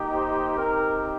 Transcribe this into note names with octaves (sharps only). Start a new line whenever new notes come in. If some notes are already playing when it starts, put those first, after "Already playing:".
Already playing: A#3 D#4 G4
C5
C4 D#4 G4 A#4